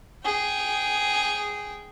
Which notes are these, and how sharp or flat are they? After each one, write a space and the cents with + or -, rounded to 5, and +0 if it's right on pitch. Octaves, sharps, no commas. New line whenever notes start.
G#4 +0 G5 -15